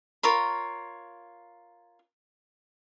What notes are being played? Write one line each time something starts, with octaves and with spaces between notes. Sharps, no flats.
F4 A#4 C#5 B5